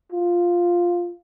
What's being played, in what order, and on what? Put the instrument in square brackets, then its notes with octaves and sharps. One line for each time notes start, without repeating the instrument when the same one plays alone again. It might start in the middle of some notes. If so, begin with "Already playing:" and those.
[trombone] F4